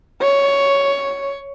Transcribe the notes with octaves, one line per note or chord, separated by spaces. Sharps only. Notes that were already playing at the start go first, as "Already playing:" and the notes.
C#5